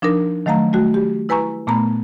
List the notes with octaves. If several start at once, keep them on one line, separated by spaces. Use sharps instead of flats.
F3 D4 D#4 A#4
D#3 F#3 A3 F5 A#5
G3 A3 F#4
G4
E4 B4 G#5 A#5 C#6
A#2 A3 B3 A#5 B5